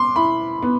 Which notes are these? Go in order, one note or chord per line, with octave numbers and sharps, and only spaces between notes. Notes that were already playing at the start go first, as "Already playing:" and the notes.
Already playing: B3 C6 D6
E4 B5
B3